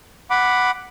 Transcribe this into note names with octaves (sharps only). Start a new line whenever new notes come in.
F#5 B5 D6